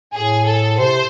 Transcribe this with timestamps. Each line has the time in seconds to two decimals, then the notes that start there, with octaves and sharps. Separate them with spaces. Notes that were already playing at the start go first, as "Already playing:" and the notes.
0.14 A2 G#4
0.46 A4
0.79 C3 C5